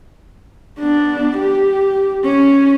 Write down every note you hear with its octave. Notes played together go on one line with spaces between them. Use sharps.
B3 D4
G4
C#4